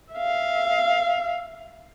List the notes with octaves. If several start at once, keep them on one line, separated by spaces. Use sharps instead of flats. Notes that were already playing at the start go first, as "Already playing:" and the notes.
E5 F5